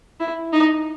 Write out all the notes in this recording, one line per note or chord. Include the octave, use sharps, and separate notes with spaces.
E4
D#4